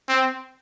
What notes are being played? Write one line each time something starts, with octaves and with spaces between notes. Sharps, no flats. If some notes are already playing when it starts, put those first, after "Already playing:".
C4